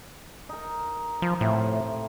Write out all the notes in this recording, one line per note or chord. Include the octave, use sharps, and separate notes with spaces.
D#4 A#4
F3
A2 C3 A3 F5